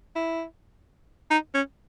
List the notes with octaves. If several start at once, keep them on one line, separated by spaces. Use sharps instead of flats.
E4
D#4
C#4